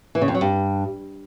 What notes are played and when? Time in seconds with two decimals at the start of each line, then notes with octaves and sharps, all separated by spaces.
0.15 E3
0.21 C#3
0.28 F2
0.34 F#3
0.41 G2